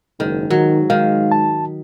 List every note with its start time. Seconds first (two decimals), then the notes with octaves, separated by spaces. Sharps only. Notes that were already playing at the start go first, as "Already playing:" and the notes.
0.20 F#1 G#2 D#3
0.50 D#3 F#3
0.90 D#3 G#3 F5
1.32 A5